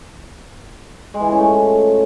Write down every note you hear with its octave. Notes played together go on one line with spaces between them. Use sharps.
G#3
E3
F4
C#4
A3